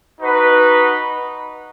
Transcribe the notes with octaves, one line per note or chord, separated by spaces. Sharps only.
D#4 F#4 B4